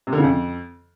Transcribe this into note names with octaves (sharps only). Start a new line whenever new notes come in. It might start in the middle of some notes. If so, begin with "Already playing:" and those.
C3
D3
C#3
F2